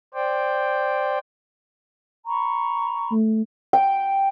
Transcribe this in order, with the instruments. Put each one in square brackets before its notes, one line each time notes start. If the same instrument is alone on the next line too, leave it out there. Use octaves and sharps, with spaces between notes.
[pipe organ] C5 D5 G5
[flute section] A#5 B5 C#6
[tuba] A3
[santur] G5